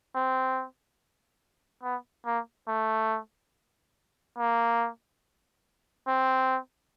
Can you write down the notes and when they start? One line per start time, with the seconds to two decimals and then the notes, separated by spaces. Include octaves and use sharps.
0.15 C4
1.83 B3
2.26 A#3
2.68 A3
4.38 A#3
6.07 C4